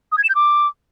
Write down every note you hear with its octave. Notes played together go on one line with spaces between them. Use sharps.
D#6
G#6
E7
G6
D6